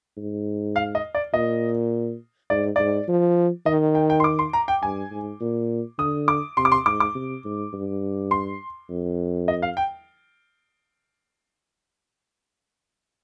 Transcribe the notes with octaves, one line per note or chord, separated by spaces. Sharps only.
G#2
F5
D#5
D5
A#2 D#5
G#2 D5
G#2 D5
F3
D#3 D#5
G5
G5
C6
D6
C6
A#5
G5
G2 G#5
G#2
A#2
D3 D#6
D6
C3 C6
D6
C6
G#2 D6
D6
C3
G#2
G2
C6
F2
D#5
F5
G5